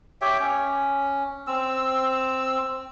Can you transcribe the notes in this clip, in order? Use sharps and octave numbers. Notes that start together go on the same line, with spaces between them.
G4 C#5 E5 G5
C#4
C4 E6